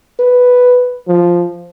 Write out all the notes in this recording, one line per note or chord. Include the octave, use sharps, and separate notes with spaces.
B4
F3